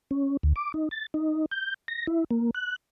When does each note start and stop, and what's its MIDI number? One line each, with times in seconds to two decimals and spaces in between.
0.11 0.37 61
0.43 0.53 38
0.56 0.72 86
0.74 0.89 63
0.91 1.06 93
1.14 1.46 63
1.51 1.74 91
1.88 2.06 94
2.07 2.24 64
2.31 2.51 58
2.55 2.76 90